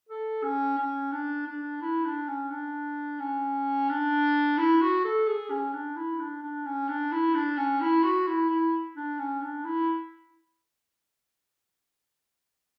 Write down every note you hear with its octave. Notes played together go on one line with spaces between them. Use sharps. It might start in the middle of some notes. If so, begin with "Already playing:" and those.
A4
C#4
C#4
D4
D4
E4
D4
C#4
D4
C#4
D4
E4
F#4
A4
G#4
C#4
D4
E4
D4
D4
C#4
D4
E4
D4
C#4
E4
F#4
E4
E4
D4
C#4
D4
E4